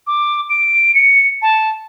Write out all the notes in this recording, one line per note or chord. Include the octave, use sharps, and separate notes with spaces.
D6
D7
C#7
A5